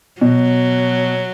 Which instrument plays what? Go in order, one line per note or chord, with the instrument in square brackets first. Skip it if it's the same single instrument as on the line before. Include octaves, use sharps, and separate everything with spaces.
[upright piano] B2 [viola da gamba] F#3